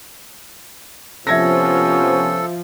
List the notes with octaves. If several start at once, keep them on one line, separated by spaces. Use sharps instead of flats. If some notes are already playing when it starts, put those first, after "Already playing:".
C3 F3 B3 C#4 A4 E5 G#6 A#6